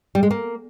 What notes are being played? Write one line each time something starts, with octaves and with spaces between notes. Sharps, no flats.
G3
G#3
A#3